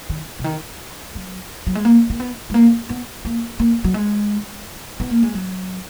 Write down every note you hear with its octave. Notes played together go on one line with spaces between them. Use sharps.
D#3
C#3
D#3
F#3
F#3
G#3
A#3
A#3
B3
G#3
A#3
B3
A#3
A#3
F#3
G#3
B3
A#3
G#3
F#3